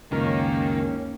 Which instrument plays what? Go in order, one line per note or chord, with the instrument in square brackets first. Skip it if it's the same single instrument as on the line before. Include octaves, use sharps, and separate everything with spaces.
[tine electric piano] C#2 F#2 A#4 [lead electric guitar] D#3 [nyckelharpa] A#3 [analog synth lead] C#4